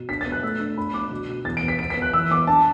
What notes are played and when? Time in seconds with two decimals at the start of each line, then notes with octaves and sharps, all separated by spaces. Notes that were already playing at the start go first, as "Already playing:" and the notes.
Already playing: B2
0.09 D4 B6
0.21 A6
0.26 B3
0.32 F#6
0.43 A3 E6
0.60 D4
0.77 D4 B5
0.94 D4 D6
1.11 B2
1.29 B2
1.45 E2 A6
1.57 D7
1.62 B3
1.68 B6
1.79 B3 D7
1.90 B6
1.97 B3
2.02 F#6
2.13 E3 E6
2.31 B3 D6
2.47 D4 A5